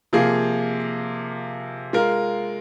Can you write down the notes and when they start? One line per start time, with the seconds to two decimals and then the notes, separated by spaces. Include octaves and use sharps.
0.13 C3 F3 A#3 F4 G#4
1.93 G#3 F4 A#4